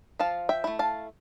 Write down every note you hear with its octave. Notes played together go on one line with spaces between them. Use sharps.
F3 F5 A5
E5 G5
A3 E4
F5 A5